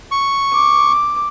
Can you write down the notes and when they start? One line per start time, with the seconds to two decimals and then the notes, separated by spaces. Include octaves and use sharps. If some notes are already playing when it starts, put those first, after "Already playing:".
0.11 C#6
0.53 D6